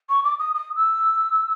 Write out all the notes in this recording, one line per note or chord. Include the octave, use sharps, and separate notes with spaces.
C#6
D6
D#6
D#6
E6